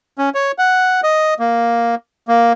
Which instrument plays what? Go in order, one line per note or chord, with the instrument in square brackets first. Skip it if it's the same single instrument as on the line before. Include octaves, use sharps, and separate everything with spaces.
[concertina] C#4
C#5
F#5
D#5
A#3
A#3